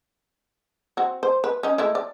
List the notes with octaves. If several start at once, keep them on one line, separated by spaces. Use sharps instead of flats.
C4 F#4
C5
B4
C#4 D#4
G#3 A3 E4
D5